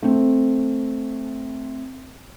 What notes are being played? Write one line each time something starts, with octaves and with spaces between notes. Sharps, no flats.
A3 C4